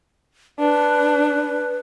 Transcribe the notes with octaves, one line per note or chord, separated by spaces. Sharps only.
D4 B4